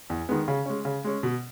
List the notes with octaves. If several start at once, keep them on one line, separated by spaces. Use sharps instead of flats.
E2
D#3 G#3 B3
C#3
G#3 C#4
C#3
G#3 C#4
B2